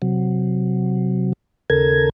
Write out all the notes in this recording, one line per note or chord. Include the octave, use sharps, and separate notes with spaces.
C3 F#3
D#2 C#3 A4 A#4 G#6